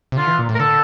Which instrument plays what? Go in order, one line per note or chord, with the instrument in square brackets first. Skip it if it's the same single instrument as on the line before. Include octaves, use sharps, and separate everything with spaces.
[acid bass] C3
[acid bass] D3 [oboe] F4
[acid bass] E3
A#2
A2
[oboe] A#4
[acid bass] D3 [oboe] A4